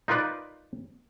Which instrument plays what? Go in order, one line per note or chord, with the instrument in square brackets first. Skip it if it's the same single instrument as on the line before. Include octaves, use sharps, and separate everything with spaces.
[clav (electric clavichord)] D#4 F4 A#4 B4 D5